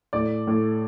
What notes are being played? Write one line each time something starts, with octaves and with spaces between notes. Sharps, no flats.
A2 D5
A2